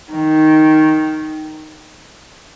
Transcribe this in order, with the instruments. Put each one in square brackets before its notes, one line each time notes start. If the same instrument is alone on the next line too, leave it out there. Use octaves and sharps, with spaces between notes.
[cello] D#3